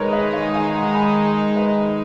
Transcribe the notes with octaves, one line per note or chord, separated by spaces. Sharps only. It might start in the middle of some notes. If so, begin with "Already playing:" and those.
Already playing: D#3 G#3 D#4 A#4 B4 C#5
B4 D#5
C#5 F5
F5 G#5
F#5 A#5
G#5 B5
B4 D#5